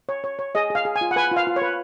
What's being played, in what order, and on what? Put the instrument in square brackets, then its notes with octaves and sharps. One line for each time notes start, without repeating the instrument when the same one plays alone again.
[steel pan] C#5
C#5
C#5
G#4 D#5
G#4 F5
G#4
G#5
F4
F#5
B4 G#5
F4
F5
F4
C#5
B4